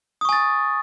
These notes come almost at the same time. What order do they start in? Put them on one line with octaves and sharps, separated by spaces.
D#6 C#6 G#5 A6